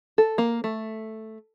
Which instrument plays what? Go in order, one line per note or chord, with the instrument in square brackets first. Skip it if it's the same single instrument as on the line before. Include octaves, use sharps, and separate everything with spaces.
[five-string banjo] A4
A#3
A3